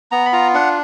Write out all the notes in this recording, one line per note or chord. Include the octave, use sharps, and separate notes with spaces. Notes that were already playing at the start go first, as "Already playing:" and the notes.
B3 A#5
B5
F4 A#5
D4 F#5